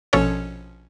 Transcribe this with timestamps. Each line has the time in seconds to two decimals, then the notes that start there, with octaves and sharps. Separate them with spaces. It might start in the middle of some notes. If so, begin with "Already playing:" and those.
0.13 A#1 B2 F3 C#4 A4 C#5